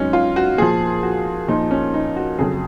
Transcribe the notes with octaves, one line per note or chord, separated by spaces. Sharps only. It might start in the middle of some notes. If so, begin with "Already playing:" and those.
Already playing: G#2 F#3 C#4 D#4
F4
F#4
A#2 F3 G#4
F#4
A#2 F3 D#4
C#4
D#4
F#4
F2 C#3 F#3 G#4